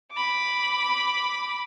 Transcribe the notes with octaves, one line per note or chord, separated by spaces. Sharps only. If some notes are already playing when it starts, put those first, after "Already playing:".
B5 D6